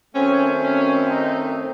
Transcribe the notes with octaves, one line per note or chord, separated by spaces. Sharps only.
F#2 D#3 A3 C4 C#4
C#4
D#4